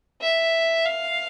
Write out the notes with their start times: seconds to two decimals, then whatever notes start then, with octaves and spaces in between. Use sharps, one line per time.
0.21 E5
0.85 F5